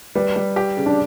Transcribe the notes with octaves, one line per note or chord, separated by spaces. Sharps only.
G3 B4
G3
G4
C#3
D4